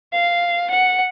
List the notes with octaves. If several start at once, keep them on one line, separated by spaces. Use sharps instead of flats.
F5
F#5